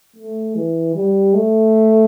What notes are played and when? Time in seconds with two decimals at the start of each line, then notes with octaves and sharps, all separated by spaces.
0.16 A3
0.56 E3
0.96 G3
1.35 A3